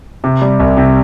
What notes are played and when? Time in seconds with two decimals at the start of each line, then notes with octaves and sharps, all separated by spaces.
0.24 C3
0.42 G3
0.60 C2
0.77 C3